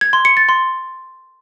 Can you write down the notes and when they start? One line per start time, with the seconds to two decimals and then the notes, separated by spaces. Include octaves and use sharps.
0.01 G#6
0.13 C6
0.25 C#7
0.37 A6
0.49 C6